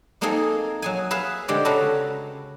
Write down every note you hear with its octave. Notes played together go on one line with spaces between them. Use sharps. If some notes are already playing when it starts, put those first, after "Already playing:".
G#3 A#3 C4 D#4 G#4 A4
F#3 G#4 G#5
G#4 B4 E5 F5
D3 G#3 C4 G4 D5 F#5
C#3 C#4 F#4 A4 B4 A#5